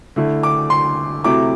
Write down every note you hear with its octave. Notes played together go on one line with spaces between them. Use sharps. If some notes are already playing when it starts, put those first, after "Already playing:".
D3 A3 E4
D6
C6
C3 F#3 A3 E4 D6